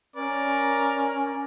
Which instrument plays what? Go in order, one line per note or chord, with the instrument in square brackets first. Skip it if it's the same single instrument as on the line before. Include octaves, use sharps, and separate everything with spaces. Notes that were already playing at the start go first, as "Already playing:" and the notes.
[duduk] C#4 [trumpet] A#4 [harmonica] D5